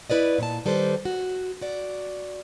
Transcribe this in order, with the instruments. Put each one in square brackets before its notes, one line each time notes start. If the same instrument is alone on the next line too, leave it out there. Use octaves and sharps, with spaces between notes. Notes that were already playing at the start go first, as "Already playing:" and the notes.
[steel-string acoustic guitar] E4 B4 D5 D#5
A#2 C#5 A5
D#3 G3 A4 B4 C5
F#4
F#4 D5